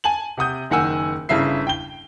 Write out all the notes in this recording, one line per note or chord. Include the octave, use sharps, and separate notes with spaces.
G#5 A5 F#7
C3 F#5 D#6 G6
F#1 D#3 F#5 G#5 E6
G1 C#3 E4 E5 C7
G5 G7